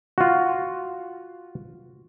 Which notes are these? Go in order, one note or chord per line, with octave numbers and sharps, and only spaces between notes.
F4 F#4